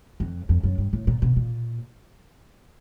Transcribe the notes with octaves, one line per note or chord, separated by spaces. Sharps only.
F2
F2
F#2
G2
A2
A#2
B2
A#2